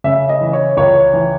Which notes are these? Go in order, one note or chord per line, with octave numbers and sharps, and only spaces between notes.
C#3 E5
D#5
E3
C#5
C#2 C#5
E3